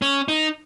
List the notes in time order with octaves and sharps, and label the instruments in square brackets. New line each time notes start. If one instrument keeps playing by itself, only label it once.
[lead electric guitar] C#4
D#4